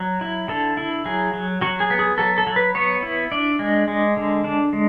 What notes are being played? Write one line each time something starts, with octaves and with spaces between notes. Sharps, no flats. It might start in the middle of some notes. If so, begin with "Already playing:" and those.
Already playing: F#3
E4
D3 A4
E4
F#3 G#4
F#3
F#3 F#4
G#4
B3
G#4
F#3 A4
A4
F#3
B4
B3 C#5
E4
D4 D5
G#3
G#3
D3
D4
G#3